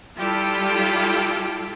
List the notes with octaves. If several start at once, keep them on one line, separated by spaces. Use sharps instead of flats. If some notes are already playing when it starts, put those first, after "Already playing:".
G3 E4 F4 G4 A4